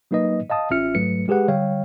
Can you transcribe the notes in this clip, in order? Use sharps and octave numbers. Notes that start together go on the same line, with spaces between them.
F#3 A#3 D#4 B4 D#5
D#5 F5 A5 D#6
A1 C#4 F4 E5 F6 C#7
G#2 F#3 A3 B4 C#7
G#3 G4 G#4 B4 F#5
D3 G3 C#5 F5 G5